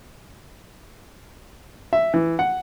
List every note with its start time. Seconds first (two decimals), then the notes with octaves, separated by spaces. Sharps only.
1.93 E5
2.14 E3
2.39 F#5